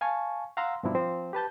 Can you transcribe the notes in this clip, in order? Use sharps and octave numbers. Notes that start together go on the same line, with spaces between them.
F5 G#5 A5 C#6
F5 F#5 A#5 C6 E6
G2 B2 F3 C4 D4 E4
F3 C4 C5
G4 B4 A5 G6